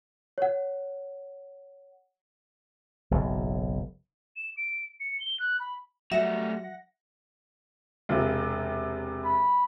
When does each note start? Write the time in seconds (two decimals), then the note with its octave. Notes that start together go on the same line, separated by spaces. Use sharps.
0.38 C#5 F#5
3.11 F#1 B1 G#2
4.36 E7
4.57 D7
5.00 C#7
5.20 G7
5.39 F#6
5.60 B5
6.12 F#3 G3 A3 E5 F#5 A#6
8.09 E1 C3
9.25 B5